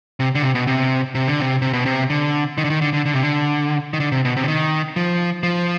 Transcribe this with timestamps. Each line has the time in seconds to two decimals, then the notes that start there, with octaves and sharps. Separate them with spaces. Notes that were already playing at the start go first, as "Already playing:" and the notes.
0.20 C3
0.35 D3
0.42 C3
0.55 B2
0.67 C3
1.15 C3
1.28 D3
1.40 C3
1.62 C3
1.73 B2
1.86 C3
2.10 D3
2.58 D#3
2.64 D3
2.70 D#3
2.82 D3
2.93 D3
3.06 D3
3.14 C3
3.22 D3
3.93 D#3
4.00 D3
4.12 C3
4.25 B2
4.36 C3
4.44 D3
4.48 D#3
4.96 F3
5.43 F3